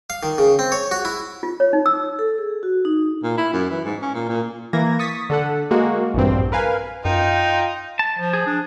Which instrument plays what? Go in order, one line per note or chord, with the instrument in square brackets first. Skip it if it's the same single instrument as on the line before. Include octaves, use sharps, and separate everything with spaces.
[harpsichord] F5
D#3
C#3
C4
C#5
F#4
E4
[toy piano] F4
C#5
D#4
E6
[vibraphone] A4
G#4
F#4
D#4
[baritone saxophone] A#2
E4
F#2
E3
G#2
C#4
A#2
A#2
[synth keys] E3 A#3 G#6 A#6
C#6 D#6 A6 B6
D3 A4 F#5
G#3 A#3 F#4
A#1 E2 G2 C4
A#4 B4 F5 G#5
[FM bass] F#2 [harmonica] D#4 [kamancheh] F4 [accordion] G5
[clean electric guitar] A5
[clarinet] F3
[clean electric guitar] G#4
[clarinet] D4